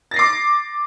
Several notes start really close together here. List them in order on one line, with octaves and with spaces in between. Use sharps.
A6 A#6 C7 D6